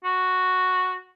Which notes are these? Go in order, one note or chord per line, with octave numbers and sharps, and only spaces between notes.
F#4